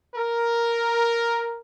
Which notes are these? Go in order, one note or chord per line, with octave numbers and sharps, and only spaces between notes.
A#4